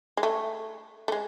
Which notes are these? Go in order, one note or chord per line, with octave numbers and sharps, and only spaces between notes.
G#3
A3
A3
G#3